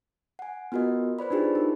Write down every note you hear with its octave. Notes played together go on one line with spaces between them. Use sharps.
F#5 G#5
B3 F4 F#4 A#4 D#5
B4 C5 D5 B5
D4 D#4 F4 G4 G#4
D#4 A#4